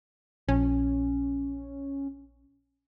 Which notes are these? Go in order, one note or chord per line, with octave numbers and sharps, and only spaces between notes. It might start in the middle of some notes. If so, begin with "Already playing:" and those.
A#1 F3 C#4